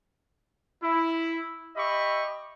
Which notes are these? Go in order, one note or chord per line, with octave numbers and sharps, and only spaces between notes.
E4
G4 D#5 E5 B5 C#6